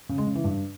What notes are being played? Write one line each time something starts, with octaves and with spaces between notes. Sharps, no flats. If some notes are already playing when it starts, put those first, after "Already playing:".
C#3
G#3
C#3
E3
G2